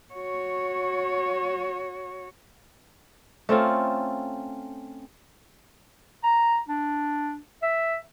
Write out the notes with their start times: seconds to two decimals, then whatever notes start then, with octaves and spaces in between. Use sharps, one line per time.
0.14 F#4 C#5
3.49 A3 C4 C#4 F4
6.23 A#5
6.68 D4
7.62 E5